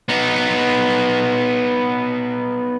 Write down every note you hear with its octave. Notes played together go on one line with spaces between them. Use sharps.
B3 D#4